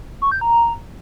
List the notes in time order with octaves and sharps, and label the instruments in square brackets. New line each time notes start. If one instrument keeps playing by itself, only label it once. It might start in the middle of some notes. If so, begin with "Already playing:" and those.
[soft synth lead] C#6
G6
A#5